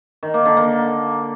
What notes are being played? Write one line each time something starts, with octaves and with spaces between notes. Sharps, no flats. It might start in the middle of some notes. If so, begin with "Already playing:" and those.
D#3
A#3
D3
A#3